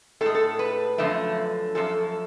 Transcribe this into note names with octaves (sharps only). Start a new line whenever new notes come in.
A2 G#3 A4
A4
B4
F#2 D3 F3 A3
F#2 F3 A4